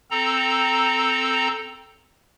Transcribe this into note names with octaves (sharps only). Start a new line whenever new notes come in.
C4 A4 A#5